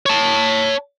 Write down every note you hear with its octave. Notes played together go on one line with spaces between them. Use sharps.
C#5 A5